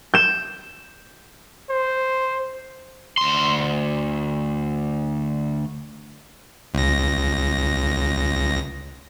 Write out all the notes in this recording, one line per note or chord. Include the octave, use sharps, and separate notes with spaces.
G6 E7
C5
D2 C6
C#2 A#6